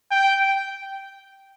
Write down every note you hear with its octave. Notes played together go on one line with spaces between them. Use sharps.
G5